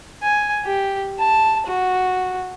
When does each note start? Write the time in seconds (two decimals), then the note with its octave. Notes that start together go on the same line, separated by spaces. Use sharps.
0.23 G#5
0.65 G4
1.19 A5
1.67 F#4